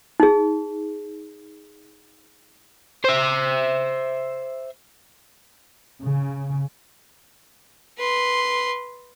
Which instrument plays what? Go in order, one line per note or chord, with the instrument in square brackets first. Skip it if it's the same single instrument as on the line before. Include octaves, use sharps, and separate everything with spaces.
[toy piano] D#4 G#4
[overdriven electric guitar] C5 E5
[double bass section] C#3
[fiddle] B4 C6